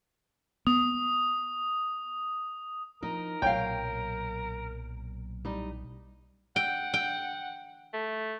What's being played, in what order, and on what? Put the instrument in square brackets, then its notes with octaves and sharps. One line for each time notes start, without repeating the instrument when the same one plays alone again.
[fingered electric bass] B3 [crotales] D#6
[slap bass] F3 [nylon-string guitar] D#4 [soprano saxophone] A#4
[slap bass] B1 A#2 F#3 [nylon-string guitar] C#5 F5 [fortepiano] G5
[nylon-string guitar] G3 D#4
[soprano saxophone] F#5 [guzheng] G5
[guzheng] G5
[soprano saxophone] A3